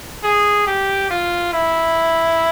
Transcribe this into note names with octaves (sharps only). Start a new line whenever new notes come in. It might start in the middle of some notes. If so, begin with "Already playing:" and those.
G#4
G4
F4
E4